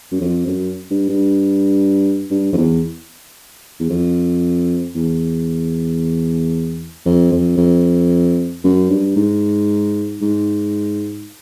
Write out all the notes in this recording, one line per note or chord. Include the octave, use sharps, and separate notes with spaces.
F#2
F2
F#2
G2
G2
G2
F2
E2
E2
F2
E2
F2
F2
F2
F#2
G2
G#2
G#2